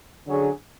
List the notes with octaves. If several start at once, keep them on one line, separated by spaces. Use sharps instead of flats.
D3 F#3 C#4 G#4